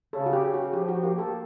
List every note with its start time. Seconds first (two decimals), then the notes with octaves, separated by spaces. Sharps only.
0.13 C#3 A4
0.26 F#4
0.33 G4
0.43 C#3
0.54 F#4
0.73 F3 G4
0.88 F#4
1.03 A#3 G4
1.18 A4